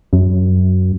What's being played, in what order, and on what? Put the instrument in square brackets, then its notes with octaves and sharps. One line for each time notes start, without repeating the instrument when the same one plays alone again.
[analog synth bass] F#2